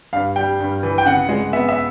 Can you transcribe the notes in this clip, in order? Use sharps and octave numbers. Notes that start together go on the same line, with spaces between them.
G2 F5
G3 G5
G2
E3
G5
C#3 F#5
G#3
B3 E5
E5